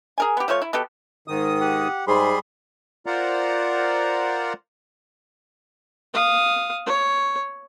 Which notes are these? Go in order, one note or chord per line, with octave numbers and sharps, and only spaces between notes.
G#4 A#4 G#5
B3 G4
F3 A3 F4 C#5
E4
B2 B3 G4 A4
G#2 D#3 D#6
G4 F#5
G#2 G3 G#4 B5 C6
F4 A#4 C5 D5 F#5 A#5
F5 D#6
C#5